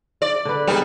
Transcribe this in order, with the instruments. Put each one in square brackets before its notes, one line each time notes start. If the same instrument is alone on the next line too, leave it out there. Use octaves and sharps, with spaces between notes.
[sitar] D5
[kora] D3 B4
[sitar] G3 [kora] B3 D#4 G#4